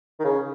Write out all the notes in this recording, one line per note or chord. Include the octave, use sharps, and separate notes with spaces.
D#3
C#3